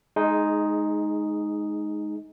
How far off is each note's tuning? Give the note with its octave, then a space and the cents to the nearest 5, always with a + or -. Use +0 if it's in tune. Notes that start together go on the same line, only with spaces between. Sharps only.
G#3 +20 D#4 +0 G#4 +0